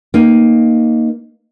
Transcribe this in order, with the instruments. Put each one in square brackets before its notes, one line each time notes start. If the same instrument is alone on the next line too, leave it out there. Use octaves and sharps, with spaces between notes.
[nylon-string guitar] A#3 D#4